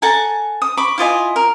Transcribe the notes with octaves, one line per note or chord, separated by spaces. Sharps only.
A4 F#5 G#5 A#5
D#6
B5 C#6 D6
E4 F4 D#5 G#5
A#4